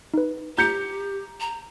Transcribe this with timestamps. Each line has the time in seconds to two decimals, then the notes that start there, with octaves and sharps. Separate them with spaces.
0.14 D#4 B4
0.58 G4 A#5 G6 C#7
1.40 A#5